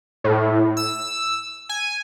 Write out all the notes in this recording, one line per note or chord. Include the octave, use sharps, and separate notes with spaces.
A2
E6
G#5